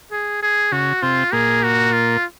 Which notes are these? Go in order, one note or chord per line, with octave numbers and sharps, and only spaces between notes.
G#4
G#4
C#3 F#4
C3 C4 F4
A#2 A#3 G#4
F#4
F4